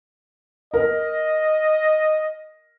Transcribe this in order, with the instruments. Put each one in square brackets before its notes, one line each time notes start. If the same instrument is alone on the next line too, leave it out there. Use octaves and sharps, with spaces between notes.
[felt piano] A#4 [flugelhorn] D#5